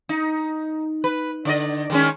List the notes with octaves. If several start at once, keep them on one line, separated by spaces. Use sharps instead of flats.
D#4
B4
D3 D5 D#5
D#3 G#3 C#4